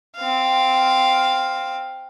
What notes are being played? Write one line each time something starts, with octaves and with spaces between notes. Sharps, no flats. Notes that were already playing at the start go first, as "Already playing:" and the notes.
C4 F5